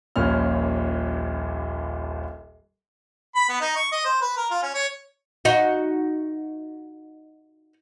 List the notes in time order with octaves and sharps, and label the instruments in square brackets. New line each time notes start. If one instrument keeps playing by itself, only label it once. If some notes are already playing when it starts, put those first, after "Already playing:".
[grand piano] D#1 A#1 D#2 C#4 F6
[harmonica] B5
B3
D#4
C#6
D#5
C5
B4
A#4
F4
C#4
C#5
[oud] D#4 F#4